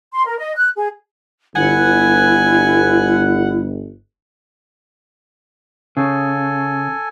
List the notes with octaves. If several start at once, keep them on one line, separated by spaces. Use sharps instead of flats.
C6
A#4
D#5
F#6
G#4
G1 E4 F#5 G#5
C#3 A4 G#5